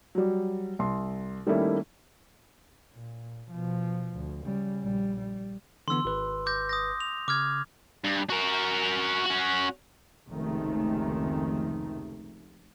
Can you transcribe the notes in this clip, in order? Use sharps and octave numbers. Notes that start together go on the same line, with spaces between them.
F#3 G3
C2 C6
D#3 G3 A3 A#3 C#4 E4
A#2
B2 F3
D2
C#3 G3
A#1 G3
G3
D3 E3 B3 C6 E6
G#1 B4
D6 G6 A#6
D#6 G6 A#6
F7
C#3 D6 F6 G#6
G2
F#4 A#4
C#4 F#4
F1 C#2 C3 D#3 A3